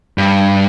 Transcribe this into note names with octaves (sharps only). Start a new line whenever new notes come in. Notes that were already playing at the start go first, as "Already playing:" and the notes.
G2